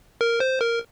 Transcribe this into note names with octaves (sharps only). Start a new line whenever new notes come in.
A#4
C5
A#4